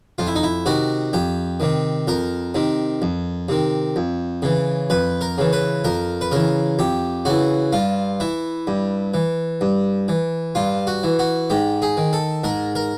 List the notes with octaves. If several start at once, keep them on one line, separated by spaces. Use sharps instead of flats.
F2 F4
E4
D#4
E4
C3 D#3 F#4
F2 G4
C3 D#3
F2 A#4
C3 D#3
F2
C3 D#3
F2
C#3 E3
F2 B4
A#4
C#3 E3
B4
F2 A#4
B4
C#3 E3 A#4
F2 G4
C#3 E3 F#4
G2 F4
E3 E4
G2
E3
G2
E3
G2 F4
F#4
E3
F#4
G#2 G4
G#4
D#3
A4
G#2 A#4
A#4